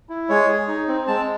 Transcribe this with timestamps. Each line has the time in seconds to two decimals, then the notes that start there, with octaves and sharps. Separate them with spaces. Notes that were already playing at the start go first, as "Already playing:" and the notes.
0.09 E4
0.29 G#3 C#5
0.49 G#4
0.68 D#4
0.88 C4
1.08 G#3 A5